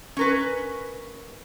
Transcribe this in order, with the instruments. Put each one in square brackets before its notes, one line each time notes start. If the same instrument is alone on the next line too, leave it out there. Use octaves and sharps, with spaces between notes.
[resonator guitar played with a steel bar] C#4 A#4 B4